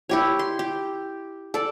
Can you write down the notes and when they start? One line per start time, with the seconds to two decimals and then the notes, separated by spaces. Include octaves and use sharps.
0.09 E4 G4 C#5
0.39 C6
0.59 G4
1.54 A4 D5